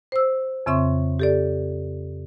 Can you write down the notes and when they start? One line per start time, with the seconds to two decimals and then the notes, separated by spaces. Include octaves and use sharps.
0.12 C5 E6
0.66 F2 C#3 C4 E5 C6 C#6
1.19 G4 A4 D5